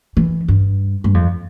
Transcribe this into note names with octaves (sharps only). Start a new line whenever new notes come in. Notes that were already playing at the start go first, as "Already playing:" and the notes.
E3
G2
G2
F2